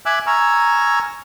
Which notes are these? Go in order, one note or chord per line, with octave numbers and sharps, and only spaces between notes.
E5 G#5 D6 E6 F#6
G#5 A#5 C#6 E6 F6